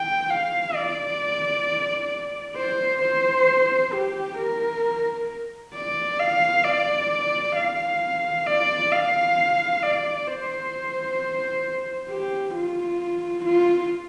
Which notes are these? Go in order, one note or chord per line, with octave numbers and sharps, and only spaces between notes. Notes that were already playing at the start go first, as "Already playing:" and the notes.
Already playing: G5
F5
D5
C5
C5
G4
A#4
D5
F5
D5
F5
D5
F5
D5
C5
G4
F4
F4